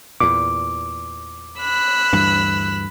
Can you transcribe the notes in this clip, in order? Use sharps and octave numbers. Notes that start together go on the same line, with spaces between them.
E2 A#2 D6
B5 E6 F#6
D2 G2 E3